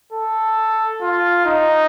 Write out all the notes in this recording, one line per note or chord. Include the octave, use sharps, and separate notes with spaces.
A4
F4
D#4